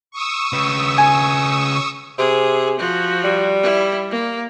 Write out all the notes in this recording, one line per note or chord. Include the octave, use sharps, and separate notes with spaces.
C#6 D#6 E6
C#3 B4
G#5
C3 G#4
F3 F#4
G3
E4
A#3